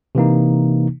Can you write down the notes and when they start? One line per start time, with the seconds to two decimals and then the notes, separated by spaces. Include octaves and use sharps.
0.15 C3 E3 A#3 D#4